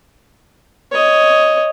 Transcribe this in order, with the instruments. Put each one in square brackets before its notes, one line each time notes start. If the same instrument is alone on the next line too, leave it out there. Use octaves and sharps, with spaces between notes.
[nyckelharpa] C#5 D#5